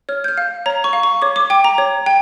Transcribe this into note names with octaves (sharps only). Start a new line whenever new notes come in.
C#5 F6
G6
F6
F5
C#5 A#5
C#6
F5
C#6
C#5 D6
D6
G5 D6
A#5
C#5
G5